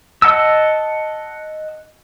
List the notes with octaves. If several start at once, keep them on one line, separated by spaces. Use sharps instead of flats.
D#5 F#5 A5 E6